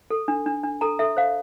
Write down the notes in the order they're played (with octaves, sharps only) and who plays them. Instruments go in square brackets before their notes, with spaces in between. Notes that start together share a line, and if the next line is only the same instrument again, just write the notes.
[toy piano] A4
D4
D4
D4
A4 A#5
A4 E5
C5 F5